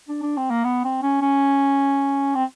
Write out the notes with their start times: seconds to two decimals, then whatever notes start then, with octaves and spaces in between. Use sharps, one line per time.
0.09 D4
0.22 D4
0.37 C4
0.50 A#3
0.65 B3
0.85 C4
1.02 C#4
1.21 C#4
2.35 C4